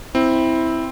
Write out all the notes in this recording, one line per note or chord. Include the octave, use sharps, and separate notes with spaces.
C4 E4